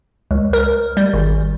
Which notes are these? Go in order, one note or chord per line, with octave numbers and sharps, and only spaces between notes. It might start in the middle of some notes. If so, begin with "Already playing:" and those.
C#2
A#4
G3
G#1